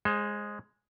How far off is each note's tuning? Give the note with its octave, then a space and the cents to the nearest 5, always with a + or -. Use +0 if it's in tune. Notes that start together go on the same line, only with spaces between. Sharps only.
G#3 +0 C5 +35